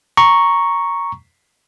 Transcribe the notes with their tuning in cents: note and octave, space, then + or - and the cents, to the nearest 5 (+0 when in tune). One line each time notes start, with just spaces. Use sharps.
A#5 +0 C#6 +0